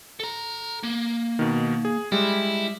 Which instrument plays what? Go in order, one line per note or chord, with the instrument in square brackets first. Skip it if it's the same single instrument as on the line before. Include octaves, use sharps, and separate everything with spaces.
[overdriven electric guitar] A4 A#5
A#3
[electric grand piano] B2 D#3
G#4
[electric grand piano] G3 G#3 [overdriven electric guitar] E4